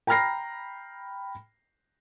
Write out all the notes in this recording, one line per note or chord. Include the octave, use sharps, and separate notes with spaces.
G5 A#5 B5 F6 A#6 C7